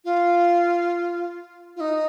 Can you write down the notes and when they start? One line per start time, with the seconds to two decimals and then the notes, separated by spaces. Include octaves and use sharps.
0.05 F4
1.76 F4
1.80 D#4